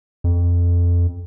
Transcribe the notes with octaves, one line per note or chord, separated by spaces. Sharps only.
F2